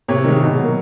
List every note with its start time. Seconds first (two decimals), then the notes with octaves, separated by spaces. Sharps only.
0.08 C3 C#5
0.24 D#3 G#3
0.41 B2
0.57 F#3 A#3